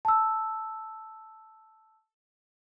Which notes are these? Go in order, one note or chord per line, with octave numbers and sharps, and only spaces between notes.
A5 E6